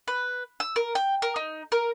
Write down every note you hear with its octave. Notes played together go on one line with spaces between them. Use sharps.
B4
E6
A#4
G5
A#4
D#4
A#4